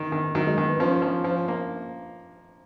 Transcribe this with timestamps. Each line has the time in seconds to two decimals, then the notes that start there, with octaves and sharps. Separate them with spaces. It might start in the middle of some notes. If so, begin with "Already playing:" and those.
Already playing: D#3
0.12 D#3
0.35 D#3 F#3
0.46 G#3
0.58 D#3
0.69 B3
0.80 F3 C#4
1.02 F3
1.24 F3
1.48 A#3